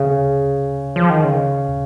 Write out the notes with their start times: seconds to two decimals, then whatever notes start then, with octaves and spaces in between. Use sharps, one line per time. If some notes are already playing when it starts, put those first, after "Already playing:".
Already playing: C#3 G#4
0.96 F3
1.10 D#3
1.24 C#3